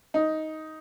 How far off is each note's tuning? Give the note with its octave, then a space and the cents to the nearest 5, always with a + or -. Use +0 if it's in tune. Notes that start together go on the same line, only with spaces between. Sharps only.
D#4 +10